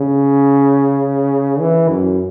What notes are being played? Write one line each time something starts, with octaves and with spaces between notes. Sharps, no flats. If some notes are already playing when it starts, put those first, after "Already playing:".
Already playing: C#3
E3
F#2